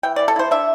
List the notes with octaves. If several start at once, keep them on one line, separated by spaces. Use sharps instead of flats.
E3 G5
E3 D5
A4
E4 C5
D4 E5